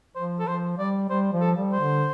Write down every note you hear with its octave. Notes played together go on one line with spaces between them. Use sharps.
F3 C5
A4
F3 C5
G3 D5
G3 C5
F3
A4
G3
C5
D3